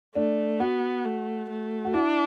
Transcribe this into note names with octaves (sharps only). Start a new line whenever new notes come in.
A3 D4
B3 F#4
A3
A3
F#4
D4 E4